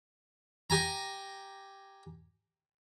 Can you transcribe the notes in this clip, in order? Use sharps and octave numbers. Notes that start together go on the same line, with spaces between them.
G4 G#5 A#5